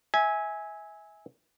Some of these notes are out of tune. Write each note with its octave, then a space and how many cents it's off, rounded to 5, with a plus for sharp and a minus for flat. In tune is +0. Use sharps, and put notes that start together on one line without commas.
E5 -25 G#5 +0